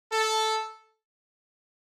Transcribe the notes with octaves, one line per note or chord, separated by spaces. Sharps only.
A4